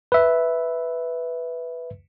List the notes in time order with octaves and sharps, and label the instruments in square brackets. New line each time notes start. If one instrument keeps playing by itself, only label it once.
[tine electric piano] B4 E5